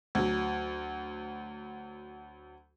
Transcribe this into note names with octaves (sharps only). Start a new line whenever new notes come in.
D2 F#3